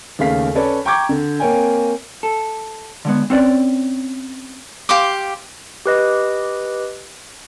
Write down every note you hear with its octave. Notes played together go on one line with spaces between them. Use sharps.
D#2 C#3 A3 F5 B6
C#4 A4 B4 C#5 D5
G5 A#5 C#6 D6 G6 G#6
D3
A#3 C4 A#4 C#5 G5 G#5
A4
D3 G#3 B3
C4 C#4 B4 D5
G4 F5 C6 D6
G4 B4 D#5